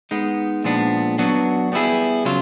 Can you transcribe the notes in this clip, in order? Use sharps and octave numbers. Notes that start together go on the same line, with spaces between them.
G#3 B3 D#4
A#2 F3 G#3 B3 D4
F#3 B3 D4 F#4
G3 B3 E4 G#4
C#3 F#3 F4